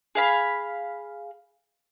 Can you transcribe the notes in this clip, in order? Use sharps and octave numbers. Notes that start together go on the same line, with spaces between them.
G#4 F5 B5